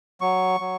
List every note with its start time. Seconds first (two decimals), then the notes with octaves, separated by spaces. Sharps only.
0.21 F#3 C#6
0.60 F#3